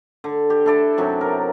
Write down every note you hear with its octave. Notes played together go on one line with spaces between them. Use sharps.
D3
G4
D4 E4 A4 D5
F#2 C3 F#3
A#4